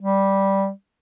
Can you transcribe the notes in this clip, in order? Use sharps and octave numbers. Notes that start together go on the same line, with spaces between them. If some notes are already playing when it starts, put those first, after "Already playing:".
G3